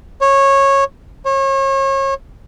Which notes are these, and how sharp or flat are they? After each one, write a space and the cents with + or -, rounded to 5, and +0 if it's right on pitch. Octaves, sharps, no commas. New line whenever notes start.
C#5 -15
C#5 -35